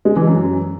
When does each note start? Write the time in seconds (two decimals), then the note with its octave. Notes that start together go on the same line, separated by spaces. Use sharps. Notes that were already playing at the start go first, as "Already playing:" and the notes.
0.05 G#3
0.16 E3
0.27 F#2